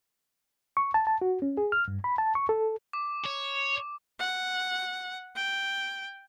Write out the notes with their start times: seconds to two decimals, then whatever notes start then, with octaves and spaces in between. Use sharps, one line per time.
0.77 C#6
0.94 A5
1.07 A5
1.22 F#4
1.42 C#4
1.57 G#4
1.72 F6
1.88 G2
2.04 B5
2.18 A5
2.35 C#6
2.49 A4
2.93 D6
3.25 C#5
4.19 F#5
5.36 G5